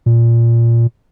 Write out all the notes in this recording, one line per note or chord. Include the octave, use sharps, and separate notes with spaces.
A#2